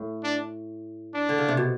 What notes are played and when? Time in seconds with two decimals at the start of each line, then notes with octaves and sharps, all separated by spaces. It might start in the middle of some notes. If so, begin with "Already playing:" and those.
Already playing: A2
0.24 D4
1.14 D4
1.29 D3
1.38 C#3
1.48 C3
1.57 B2